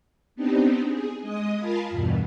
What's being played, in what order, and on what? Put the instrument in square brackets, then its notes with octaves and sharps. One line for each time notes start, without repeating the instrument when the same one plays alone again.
[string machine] B3 C4 D4 D#4 G4
G#4
G#3 D#5 D#6
F4 A#4 F5 G#5 A5 B5
E2 G2 B2